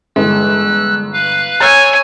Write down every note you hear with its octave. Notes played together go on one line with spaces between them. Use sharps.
G1 E3 G#3 E6 F#6
B4 F5 F#6
C#5 G#5 A#5 E6 F6 G6 A6